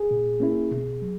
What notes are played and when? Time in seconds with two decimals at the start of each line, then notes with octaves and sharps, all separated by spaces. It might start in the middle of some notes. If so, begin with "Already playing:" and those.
Already playing: G#4
0.11 A#2
0.40 A#3 C#4 E4
0.71 B2
1.02 F#3